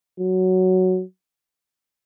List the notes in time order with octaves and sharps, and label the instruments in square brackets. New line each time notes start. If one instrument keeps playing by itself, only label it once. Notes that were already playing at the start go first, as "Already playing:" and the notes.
[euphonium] F#3